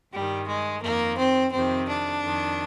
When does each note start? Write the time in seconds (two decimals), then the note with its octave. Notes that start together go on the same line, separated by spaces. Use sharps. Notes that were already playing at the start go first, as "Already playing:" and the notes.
0.12 G2 D#3 G3
0.48 G#3
0.82 F2 D#3 A#3
1.18 C4
1.52 F2 C3 D#3 C4
1.88 D4
2.23 F2 D#3